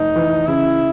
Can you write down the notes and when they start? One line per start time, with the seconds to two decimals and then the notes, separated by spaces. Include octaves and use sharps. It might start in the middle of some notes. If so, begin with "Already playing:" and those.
Already playing: F1 D#4
0.16 E3
0.47 C#3 E4